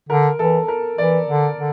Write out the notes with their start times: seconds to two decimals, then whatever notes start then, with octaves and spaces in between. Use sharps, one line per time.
0.09 D3 A#4
0.39 E3 A4
0.68 A#4
0.98 E3 D5
1.28 D3
1.57 D3